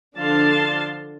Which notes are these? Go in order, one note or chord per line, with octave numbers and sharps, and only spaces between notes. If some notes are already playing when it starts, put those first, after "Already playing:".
D3 F3 D4 F5 A5 C6